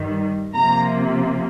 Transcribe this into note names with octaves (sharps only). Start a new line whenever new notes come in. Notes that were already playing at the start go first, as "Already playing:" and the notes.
Already playing: G2 D#3 G3
C3 F3 A#3 A#5